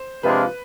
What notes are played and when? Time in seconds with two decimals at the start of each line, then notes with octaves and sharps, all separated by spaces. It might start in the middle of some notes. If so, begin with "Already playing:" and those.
Already playing: C5
0.23 C3 F3 G#3 D4 F4 B4